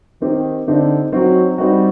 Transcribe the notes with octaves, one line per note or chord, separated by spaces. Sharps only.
D#3 C4 D#4 G4
D3 C4 D#4 G4
F#3 C4 D#4 F#4
G3 C4 D#4 F#4